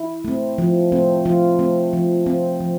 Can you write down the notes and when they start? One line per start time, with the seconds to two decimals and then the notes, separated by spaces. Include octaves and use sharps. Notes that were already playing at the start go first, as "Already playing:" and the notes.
Already playing: E4
0.25 A3 C4
0.58 F3
0.92 A3 C4
1.25 F3 F4
1.59 A3 C4
1.93 F3
2.26 C4
2.60 F3